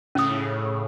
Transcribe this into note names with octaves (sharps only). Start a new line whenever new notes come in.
A2 C#3 C#4 D#6